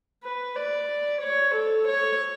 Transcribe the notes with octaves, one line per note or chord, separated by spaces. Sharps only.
B4
D5
C#5
A4
C#5